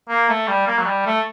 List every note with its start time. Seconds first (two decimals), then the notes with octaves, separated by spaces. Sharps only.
0.10 A#3
0.29 A3
0.48 G3
0.67 A#3
0.79 F#3
0.86 G3
1.06 A3